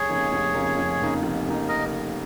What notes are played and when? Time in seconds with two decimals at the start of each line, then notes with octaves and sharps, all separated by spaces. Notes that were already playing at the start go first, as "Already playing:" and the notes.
Already playing: F1 G#4 C#5
0.09 F2 C#3 A#3 D#4
0.33 F1
0.54 F2 C#3 A#3 D#4
0.78 F1
1.00 F2 C#3 A#3 D#4
1.23 F1
1.46 F2 C#3 A#3 D#4
1.69 A#4 D#5